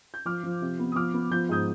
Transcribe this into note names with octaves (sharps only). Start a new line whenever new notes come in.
G6
F3 D6 F6
F3
C3
B3
D#6
F3 D6 F6
B3
F3 G6
G#2 D#6 G6